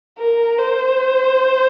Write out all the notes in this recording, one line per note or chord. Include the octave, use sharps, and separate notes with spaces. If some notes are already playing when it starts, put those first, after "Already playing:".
A#4
C5